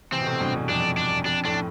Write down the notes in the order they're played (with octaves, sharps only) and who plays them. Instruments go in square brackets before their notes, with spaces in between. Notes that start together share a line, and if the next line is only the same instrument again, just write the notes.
[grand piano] C3 E3 [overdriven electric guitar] C4
[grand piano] B2
A2 C3
G2 B2
E2 G2
[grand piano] F2 [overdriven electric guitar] D4
[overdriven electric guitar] D4
[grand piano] F2 [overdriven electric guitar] D4
[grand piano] F2 A2 [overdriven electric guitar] D4